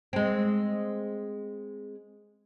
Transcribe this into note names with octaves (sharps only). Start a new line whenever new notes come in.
G#3 C4